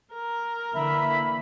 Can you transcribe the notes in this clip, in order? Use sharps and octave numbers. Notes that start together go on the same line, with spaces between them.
A#4
D3 E3 A#3 E5 B5